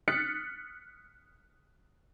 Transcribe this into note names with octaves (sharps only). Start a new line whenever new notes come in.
D#6 F6 F#6 A6 B6 C#7